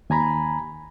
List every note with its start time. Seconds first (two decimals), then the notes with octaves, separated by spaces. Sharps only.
0.10 D#2 G#5 A#5 B5